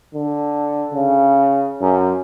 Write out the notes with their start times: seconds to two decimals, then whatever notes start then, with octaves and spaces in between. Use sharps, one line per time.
0.14 D3
0.93 C#3
1.81 F#2